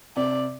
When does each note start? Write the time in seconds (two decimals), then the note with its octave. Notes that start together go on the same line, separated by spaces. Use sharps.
0.17 C3 D5